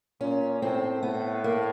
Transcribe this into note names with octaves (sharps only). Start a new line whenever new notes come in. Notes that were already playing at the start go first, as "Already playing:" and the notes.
A#2 C#4
A2 C4
A2 B3
A#3